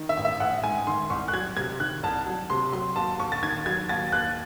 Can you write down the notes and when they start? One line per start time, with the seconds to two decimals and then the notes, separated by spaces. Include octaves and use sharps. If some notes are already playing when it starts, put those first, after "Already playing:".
Already playing: D#3
0.09 E5
0.17 A1
0.25 E5
0.40 A1 F#5
0.64 G#2 G#5
0.87 D#3 C6
1.10 C2 C#6
1.28 F#6
1.33 F#3 G#6
1.57 C3 G#6
1.80 D#3 F#6
2.03 C2 A5
2.27 F#3
2.50 C3 C6
2.72 F#3 C6
2.96 D#2 A5
3.20 D#2 C#6
3.32 A6
3.42 D#3 G#6
3.66 F#3 G#6
3.89 D#2 A6
4.12 D#2 F#6